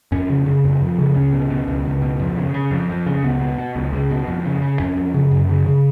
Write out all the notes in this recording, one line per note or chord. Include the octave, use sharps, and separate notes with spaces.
F2 C#4
C#3
C#3
F2
F2
C#3
C#2 C#4
B2
B2
C#2
C#2
B2
F2
C#3
C#3
F2
F2
C#3
C#2 B3
B2
B2
C#2
C#2
B2
F2
C#3
C#3
F2 C#4
F2
C#3
F#2
C#3
C#3